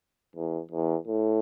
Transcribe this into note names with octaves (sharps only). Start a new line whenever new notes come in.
E2
E2
A2